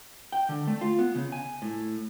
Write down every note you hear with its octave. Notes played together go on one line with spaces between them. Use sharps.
G5
D3
A3
F4
B3
C#3
G#5
A2